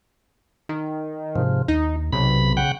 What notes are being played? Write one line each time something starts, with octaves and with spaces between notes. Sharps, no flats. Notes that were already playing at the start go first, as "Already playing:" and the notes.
D#3
G#2 C3 F3
D#2 D#4
B1 C3 B5
C#3 F#5 G5